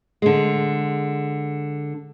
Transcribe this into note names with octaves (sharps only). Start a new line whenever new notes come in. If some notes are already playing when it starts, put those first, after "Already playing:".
D3 G#3